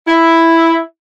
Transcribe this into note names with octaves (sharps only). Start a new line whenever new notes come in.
E4